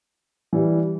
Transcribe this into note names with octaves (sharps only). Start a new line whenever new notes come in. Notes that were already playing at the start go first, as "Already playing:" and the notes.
E3 G3